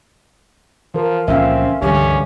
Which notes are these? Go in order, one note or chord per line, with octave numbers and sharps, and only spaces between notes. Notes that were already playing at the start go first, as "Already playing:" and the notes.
E3 F3 A#4
C#2 A#2 F3 C4 C#4 E5 F5
C#2 G2 D3 E3 G3 C#4 G4